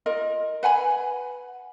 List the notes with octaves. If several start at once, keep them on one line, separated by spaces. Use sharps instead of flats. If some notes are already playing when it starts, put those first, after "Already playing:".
F4 A#4 D#5
B4 F#5 G#5 B5